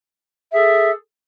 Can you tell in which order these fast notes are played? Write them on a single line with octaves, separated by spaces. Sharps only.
E5 G#4 A4